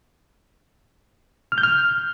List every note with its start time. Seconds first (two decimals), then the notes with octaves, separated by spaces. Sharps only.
1.52 F6
1.58 G6
1.63 F6